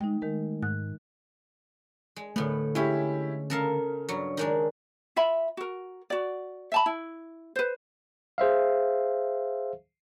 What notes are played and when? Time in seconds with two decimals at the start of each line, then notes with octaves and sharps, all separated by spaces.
0.01 D#3 G#3 D#4 G5
0.22 D#3 G#3 A3 A#4
0.63 G#2 F#6
2.16 G#3
2.36 A2 D3 A3 B3
2.75 G#3 C#4 E4 G4
3.50 C#3 A4 A#4 F5
4.09 G2 F#3
4.37 D#3 G#3 D4
5.16 F4 E5 B5
5.57 F#4 A#4
6.10 F#4 D5
6.72 E5 A5 B5
6.86 E4
7.56 B4 C5
8.38 G#4 C5 E5 F5